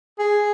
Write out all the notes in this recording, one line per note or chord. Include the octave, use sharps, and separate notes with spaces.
G#4